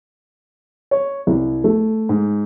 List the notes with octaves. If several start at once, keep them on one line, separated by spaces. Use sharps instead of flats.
C#5
C2
A3
G#2